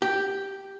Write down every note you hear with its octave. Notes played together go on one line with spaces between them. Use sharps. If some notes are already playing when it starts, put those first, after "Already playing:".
G4